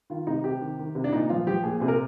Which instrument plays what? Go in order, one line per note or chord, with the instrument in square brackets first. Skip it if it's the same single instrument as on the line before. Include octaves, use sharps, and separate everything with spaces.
[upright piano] D#3 F4
C3 D#4
C3 G4
D#3
D#3
C3
D4
A#2 D#4
F3 F4
F3 G4
A#2 G#4
C3 G#4
A#4